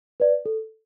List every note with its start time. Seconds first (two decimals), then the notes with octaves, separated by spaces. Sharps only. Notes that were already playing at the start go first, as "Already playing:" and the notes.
0.20 B4 D5
0.46 A4